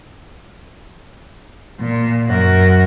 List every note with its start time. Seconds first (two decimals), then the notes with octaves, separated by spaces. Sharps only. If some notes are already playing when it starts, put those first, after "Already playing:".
1.80 A#2
2.29 F#2 F#4 A#4